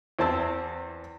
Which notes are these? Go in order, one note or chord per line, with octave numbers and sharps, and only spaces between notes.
E2 C4 A5 E6